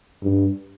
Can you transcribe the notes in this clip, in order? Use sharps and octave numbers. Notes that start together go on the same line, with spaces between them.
G2